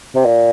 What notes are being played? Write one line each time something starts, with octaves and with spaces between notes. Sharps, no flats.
C3
A#2